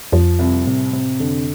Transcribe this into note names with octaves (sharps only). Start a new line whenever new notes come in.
F2 F3
C2
A2 C3
C3
F2 D3